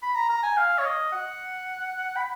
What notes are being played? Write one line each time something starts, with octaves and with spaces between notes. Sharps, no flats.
B5
A#5
A#5
G#5
F5
C#5
D#5
F#5
B5